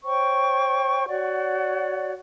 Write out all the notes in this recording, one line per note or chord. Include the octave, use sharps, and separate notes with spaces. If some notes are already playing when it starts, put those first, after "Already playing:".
C5 C#5 G5 C#6
F#4 C#5 D5 F#5